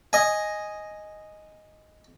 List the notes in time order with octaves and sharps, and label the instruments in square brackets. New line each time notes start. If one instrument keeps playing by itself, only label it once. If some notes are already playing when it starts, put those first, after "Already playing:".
[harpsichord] D#5 G#5